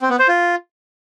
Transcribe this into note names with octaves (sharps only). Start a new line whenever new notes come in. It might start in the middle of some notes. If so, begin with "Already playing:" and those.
C4
B3
C5
F4